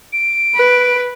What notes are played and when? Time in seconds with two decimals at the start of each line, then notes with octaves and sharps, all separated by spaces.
0.13 D7
0.55 B4